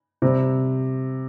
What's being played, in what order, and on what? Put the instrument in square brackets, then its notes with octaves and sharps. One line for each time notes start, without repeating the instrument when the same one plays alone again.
[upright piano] C3 G3 C4